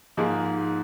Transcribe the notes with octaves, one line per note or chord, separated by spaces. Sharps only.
G#2 F3 A#3 D#4 G#4